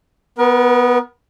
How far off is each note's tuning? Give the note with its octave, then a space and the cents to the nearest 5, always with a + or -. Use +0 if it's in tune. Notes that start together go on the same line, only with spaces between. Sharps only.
B3 +0 A#4 +40